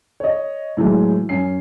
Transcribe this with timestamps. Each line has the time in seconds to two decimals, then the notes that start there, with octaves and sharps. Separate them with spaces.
0.20 C#5 D#5
0.77 A2 E3 F#3 G#3
1.29 F#2 C#4 C7